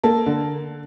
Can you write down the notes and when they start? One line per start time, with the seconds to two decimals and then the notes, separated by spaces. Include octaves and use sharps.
0.04 A#3 A4
0.26 D3